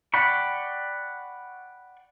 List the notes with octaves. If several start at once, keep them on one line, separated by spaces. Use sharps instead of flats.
D5 F#5 G5 B5 C#6